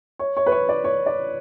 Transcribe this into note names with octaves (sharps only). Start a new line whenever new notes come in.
C#5
C#5
B4
C#5
D5
C#5
D5